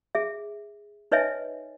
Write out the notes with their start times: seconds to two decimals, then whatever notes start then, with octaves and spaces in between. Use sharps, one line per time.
0.15 G#4 E5
1.12 D#4 B4 C#5 D#5 E5 G#5